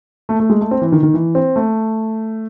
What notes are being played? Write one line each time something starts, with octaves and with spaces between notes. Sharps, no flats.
A3
A3
G#3
A3
C4
E3
D#3
D#3
E3
C4
A3